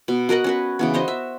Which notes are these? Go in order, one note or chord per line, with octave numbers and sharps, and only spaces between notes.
B2
F#4 A#4 D#5 F#5
C#4 F#4 B4
C#3 E3 B3
F#4 C5 D#5
E5